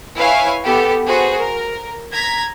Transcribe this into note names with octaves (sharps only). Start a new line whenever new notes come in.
E4 B4 C#5 F5 G#5
B3 G4 A4
F#4 G#4 B4 C5
A#4
A#5 G#6 B6